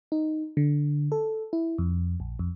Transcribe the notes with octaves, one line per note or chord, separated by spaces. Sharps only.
D#4
D3
A4
E4
F2
A#1
F2